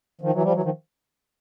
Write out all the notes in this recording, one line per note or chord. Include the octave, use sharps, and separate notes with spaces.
D#3 F3
E3 F#3
F3 G3
E3 F#3
D#3 F3